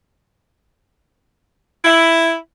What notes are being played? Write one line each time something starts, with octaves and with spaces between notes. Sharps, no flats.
E4